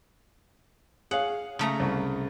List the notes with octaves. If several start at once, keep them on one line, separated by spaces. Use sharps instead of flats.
G#4 C#5 F5 F#5
C#3 A3 A#5
C2